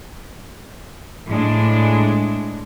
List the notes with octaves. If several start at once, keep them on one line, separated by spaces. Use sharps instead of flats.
A2 G#3 D4